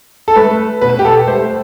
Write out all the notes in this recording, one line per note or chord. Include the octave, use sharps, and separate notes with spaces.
A4
A3 B4
B2 B4
G4
A4
A3 C5